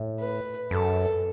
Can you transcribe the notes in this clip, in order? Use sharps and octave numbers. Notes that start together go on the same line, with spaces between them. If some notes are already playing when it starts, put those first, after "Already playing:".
Already playing: A2
B4
F#2 A4